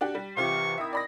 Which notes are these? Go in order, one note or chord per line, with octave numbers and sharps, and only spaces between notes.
D4 F#4 G4
G3
C2 C3 E3 C4 F4 C#6
D#3 C4 E4 E5 D#6
D5 B5 A#6